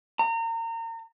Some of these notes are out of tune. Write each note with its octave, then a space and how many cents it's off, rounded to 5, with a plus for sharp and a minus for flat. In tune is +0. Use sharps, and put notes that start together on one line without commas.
A#5 -30